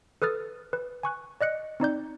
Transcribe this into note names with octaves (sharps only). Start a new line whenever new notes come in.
A4 B4 D#6 F6 A6
B4
G#5 C#6 F#6
D5 D#5 F#6 C#7
C4 D#4 D5 G6